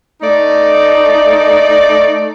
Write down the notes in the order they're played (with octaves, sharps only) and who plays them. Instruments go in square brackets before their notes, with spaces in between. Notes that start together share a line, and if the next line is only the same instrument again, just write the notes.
[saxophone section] A3 D#4 D5